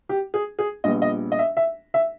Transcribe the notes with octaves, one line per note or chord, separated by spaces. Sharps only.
G4
G#4
G#4
A#1 A#2 G3 B3 D#5
D#5
D#5
E5
E5
E5